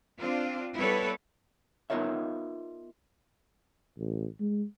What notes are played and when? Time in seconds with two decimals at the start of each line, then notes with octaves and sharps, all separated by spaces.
0.19 C4 D4 F4
0.77 G3 B3 E4 A4 B4 C#5
1.90 B3 D#4 F4 A#4 C#5 E5
3.97 A1
4.40 G#3